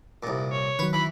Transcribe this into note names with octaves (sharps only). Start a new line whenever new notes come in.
C2 A#2
C#5
D#3 F#3 B4
E3 B5